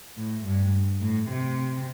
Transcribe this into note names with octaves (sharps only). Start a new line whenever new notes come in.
A2
G2
A2
C3